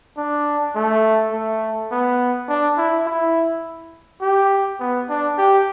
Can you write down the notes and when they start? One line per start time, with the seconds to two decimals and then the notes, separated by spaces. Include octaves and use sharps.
0.17 D4
0.76 A3
1.32 A3
1.91 B3
2.49 D4
2.78 E4
3.07 E4
4.22 G4
4.80 B3
5.09 D4
5.38 G4